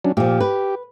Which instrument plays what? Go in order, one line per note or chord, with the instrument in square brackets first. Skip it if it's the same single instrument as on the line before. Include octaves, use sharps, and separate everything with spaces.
[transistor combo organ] F#3 C#4 D4
[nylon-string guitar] A#2 F3 [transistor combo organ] G4
[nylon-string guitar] B4